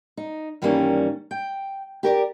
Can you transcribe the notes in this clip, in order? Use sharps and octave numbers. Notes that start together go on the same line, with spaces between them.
D#4
G2 D#3 E3 G3 A#3 C#4
G5
G4 A#4 C#5 D5